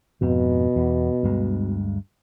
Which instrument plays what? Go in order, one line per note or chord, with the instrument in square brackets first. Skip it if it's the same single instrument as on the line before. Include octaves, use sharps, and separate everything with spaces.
[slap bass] F2 G#2 [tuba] B2
[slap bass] E2
D2 G2 G#3